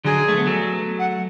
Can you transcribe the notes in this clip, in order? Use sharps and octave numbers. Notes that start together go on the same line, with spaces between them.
D3 F#3 G#4
A3
B3
F#3 A3
F#5